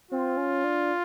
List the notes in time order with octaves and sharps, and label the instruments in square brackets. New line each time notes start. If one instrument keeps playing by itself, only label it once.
[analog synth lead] C4 [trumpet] F4
[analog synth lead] C#4
D4